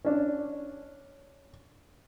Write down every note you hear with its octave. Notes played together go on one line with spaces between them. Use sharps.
C#4 D4